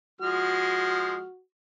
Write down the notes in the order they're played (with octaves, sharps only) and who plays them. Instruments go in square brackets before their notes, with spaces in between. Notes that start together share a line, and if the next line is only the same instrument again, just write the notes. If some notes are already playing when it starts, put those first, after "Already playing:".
[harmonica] F3 G#3 F6 [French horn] F#4